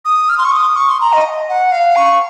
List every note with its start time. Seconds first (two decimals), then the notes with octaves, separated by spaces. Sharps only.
0.05 D#6
0.29 F6
0.38 C6
0.45 C#6
0.52 D#6
0.76 C#6
0.89 C6
1.01 A#5
1.13 D#5
1.49 F#5
1.72 F5
1.96 C#6